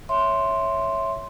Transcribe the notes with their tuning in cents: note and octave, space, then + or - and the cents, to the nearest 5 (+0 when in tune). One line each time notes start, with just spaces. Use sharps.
C#5 +0 E5 +0 C6 +0